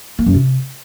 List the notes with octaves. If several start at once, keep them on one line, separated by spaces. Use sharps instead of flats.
A#3
F#2
C3